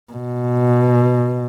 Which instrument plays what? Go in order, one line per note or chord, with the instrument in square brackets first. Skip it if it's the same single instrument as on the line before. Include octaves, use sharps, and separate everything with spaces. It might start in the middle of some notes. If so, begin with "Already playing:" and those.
[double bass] B2